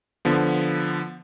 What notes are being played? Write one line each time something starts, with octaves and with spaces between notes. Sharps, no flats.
D3 F3 B3